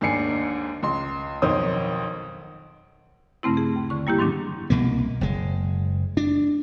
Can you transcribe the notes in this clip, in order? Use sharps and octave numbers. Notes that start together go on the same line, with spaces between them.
D#2 G#2 D4 G#5 C7 C#7
C#2 C6
B1 F2 D#3 C5 C#5 D#6
G2 C#3 A3 C4 E4
G#4
D#2
D3 C#6
G3 A#3 E4 G4
G#2 D#3 F#3 C#4 D4
C2 B2 A#3
F#1 G#3
D4